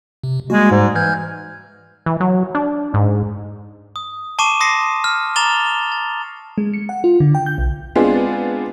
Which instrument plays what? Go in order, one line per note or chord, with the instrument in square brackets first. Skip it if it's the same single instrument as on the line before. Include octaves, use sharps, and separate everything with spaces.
[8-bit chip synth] C3
[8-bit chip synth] G3 A#3 F#4 [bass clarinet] G#3
[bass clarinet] G#2 [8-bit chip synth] G3 D5
[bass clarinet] E3 [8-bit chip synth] F6 G6 G#6
[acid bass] E3
F#3
D4
G#2
[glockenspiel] D#6
A5 C#6 D6 C7 D#7 E7
C6 D#6 A#6 C7 C#7
F6
A#5 D6 A6 E7 F7 G7
A6
[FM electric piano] G#3
C#7
F#5
F4
D3
G5
G6
B1
[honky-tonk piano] G#3 B3 C4 D4 F4 G#4